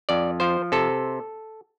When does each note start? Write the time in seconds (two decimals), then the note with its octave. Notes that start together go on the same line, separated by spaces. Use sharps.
0.09 F2 D5
0.40 F3 C5
0.72 C3 A4